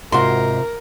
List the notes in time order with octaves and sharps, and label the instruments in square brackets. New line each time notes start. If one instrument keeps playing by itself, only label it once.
[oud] G#2 F#4 [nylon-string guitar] C3 F4 [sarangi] A#4 [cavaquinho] C6